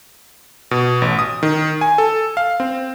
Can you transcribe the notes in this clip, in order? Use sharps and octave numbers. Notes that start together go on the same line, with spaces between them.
B2
A1
D#6
D#3
G#5
A4
F5
C4